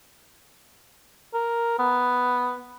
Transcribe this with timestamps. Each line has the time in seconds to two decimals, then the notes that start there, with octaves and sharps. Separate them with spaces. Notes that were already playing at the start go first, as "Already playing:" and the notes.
1.34 A#4
1.79 B3